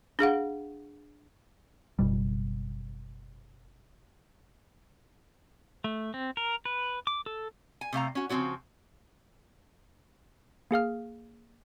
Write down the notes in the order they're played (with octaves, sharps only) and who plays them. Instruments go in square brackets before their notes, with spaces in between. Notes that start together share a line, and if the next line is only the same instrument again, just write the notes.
[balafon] D4 G#4 F5 F#5
[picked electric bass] F#1 B2 G3
[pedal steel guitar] A3
C4
A#4
B4
D6
A4
[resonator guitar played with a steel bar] G#5
C3 A3 F5 A#5
C#4 F#4
C#3 F3 A3 C4 F#4 C#5
[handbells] A#3 G#4 F5 F6